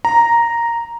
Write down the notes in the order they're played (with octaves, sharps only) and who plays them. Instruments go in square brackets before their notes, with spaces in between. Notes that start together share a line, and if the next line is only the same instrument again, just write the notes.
[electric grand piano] A#5